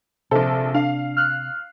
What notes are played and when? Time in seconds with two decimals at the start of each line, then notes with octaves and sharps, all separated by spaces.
0.31 A#1 C3 A4 C5 E5 A5
0.74 D4 F5
1.17 F6 F#6